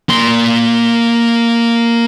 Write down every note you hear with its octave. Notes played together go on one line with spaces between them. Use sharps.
A#3 C6